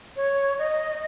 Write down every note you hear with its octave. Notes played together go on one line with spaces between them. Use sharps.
C#5
D#5